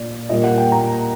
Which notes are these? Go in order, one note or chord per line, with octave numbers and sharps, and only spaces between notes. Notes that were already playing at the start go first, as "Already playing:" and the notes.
Already playing: A#2 D5
A#2 G3 A#3 D#5
F#5
G5
A#5